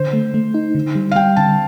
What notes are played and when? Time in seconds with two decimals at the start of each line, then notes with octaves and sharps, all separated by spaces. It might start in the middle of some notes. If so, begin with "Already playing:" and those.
Already playing: D3 C5
0.13 A3
0.34 A3
0.54 D#4
0.75 D3
0.95 G3
1.12 F5
1.16 G3 G5
1.36 D3 A5